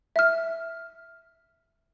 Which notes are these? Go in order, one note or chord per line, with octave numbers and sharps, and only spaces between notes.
E5 F6